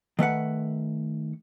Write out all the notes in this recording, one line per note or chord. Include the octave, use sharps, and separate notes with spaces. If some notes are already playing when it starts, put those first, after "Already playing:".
D#3 A3 B4 F#5